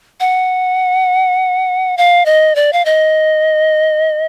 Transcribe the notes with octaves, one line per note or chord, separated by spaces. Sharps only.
F#5
F5
D#5
D5
F5
D#5